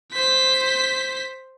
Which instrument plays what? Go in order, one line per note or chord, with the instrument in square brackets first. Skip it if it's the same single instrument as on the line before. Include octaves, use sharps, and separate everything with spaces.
[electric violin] C5 B6